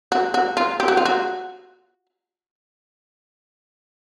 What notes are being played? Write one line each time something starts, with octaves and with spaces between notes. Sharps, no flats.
F#4
F#4
F4
G4
F#4
F4
F#4